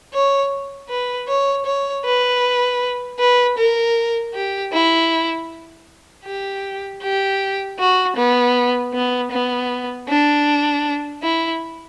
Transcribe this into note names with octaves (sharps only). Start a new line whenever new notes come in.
C#5
B4
C#5
C#5
B4
B4
A#4
G4
E4
G4
G4
F#4
B3
B3
B3
D4
E4